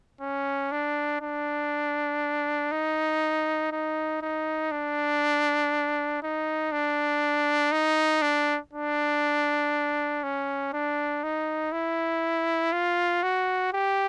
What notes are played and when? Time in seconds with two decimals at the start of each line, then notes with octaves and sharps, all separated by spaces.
0.21 C#4
0.72 D4
1.22 D4
2.72 D#4
3.72 D#4
4.22 D#4
4.72 D4
6.23 D#4
6.72 D4
7.72 D#4
8.22 D4
8.73 D4
10.23 C#4
10.73 D4
11.23 D#4
11.72 E4
12.72 F4
13.23 F#4
13.73 G4